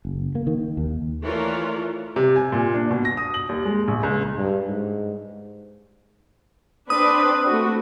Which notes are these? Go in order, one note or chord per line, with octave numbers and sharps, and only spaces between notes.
F#1
A#3
D#3
D#2
E3 A3 F4 A#4 C#5 D5
C3
G#5
A#2
D4
B2
A#6
D#6
F#7
D#2
G#3
A#1
C#2
G2
G#2
C4 D4 B4 D#6
A3 F#4